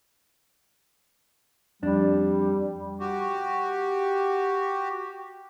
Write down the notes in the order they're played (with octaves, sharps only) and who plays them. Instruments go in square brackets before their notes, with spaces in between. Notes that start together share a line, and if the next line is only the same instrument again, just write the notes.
[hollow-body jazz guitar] F2 D4 [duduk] G3
[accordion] F#4 G4